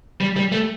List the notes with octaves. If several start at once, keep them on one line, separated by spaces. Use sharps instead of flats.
G3
G3
A3